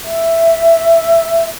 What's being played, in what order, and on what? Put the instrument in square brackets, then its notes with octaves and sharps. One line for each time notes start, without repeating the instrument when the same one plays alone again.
[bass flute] E5